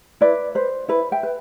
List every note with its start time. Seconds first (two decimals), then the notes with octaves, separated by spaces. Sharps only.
0.21 E4 B4 D5
0.55 B4 C5
0.88 E4 B4
1.12 E5 G5
1.23 B4